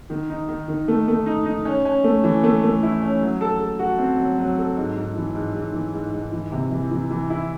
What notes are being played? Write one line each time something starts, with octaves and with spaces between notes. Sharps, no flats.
D#3
D#4
D#3
D#3
A3
A3
D#4
D#4
C#4
C#4
A3
E3
A3
A3
E4
C#4
F#3
A4
A4
F#4
C4
F#3
F#3
A4
G#2
G#2
E3
G#2
G#2
E3
G#2
G#2
E3
C3
E3
E3
E3
E4